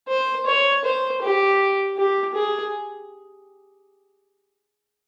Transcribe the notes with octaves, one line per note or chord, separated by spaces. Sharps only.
C5
C#5
C5
G4
G4
G#4